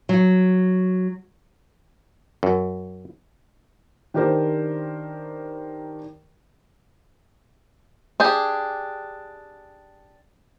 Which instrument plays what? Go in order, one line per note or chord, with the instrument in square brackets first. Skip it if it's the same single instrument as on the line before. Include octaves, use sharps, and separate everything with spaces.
[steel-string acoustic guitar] F#3
[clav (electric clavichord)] F#2
[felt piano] D#3 D4 G4 A#4 C5
[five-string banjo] D4 G4 G#4